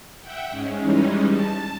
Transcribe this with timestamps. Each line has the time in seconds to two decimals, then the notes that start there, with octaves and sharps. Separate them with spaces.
0.20 E5 F#5 G5
0.49 G#2 G#3 C#4
0.79 E3 G3 G#3 C#4 D#4
1.29 A5